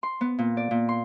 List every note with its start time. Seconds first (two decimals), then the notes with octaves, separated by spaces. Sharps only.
0.03 C6
0.21 B3
0.38 A#2
0.57 D5
0.71 A#2
0.89 C6